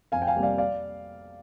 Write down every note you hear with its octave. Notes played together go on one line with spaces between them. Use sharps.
F2 F5 G#5
G5
F5 G#5
C3 G3 A#3
D5 F5
D5 F5